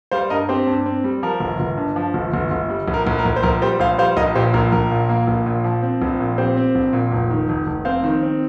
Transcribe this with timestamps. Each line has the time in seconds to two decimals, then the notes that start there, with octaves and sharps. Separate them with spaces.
0.11 G3 C5 F5
0.30 G2 A#4 D#5
0.49 C4 G4 C5
0.67 G2
0.86 C4
1.04 G3
1.23 F3 A#4
1.40 G1
1.60 G1
1.77 G2
1.96 F3
2.14 G1
2.34 G1
2.51 G1
2.70 G3
2.88 A#1
2.94 A#4
3.07 A#1
3.19 A#4
3.26 A#1
3.36 C5
3.43 A#1 A#4
3.62 G3 G4 C5
3.80 A#1 C5 F5
3.98 G3 C5 F5
4.17 A#1 A#4 D#5
4.35 A#2 G4 C5
4.54 A#1 A#4
4.72 A#1 A#4
4.91 A#2
5.09 A#3
5.27 A#1
5.46 A#2
5.64 F3
5.83 C4
6.02 A#1
6.20 A#2
6.38 C4 G4 C5
6.57 C4
6.75 A#1
6.93 A#2
7.11 F1
7.30 D#3
7.49 F1
7.67 F1
7.85 C4 C5 F5
8.04 D#3
8.23 C4